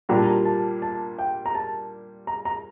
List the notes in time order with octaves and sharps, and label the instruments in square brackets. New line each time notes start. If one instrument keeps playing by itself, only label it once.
[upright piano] A#2 G3 A#3 D4 G4 [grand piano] A#5
[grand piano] A5
A#5
A5
A5
G5
A#5
A5
A#5
A#5